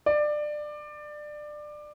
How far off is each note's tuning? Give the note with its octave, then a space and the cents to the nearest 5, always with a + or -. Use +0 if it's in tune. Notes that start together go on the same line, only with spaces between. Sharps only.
D5 +20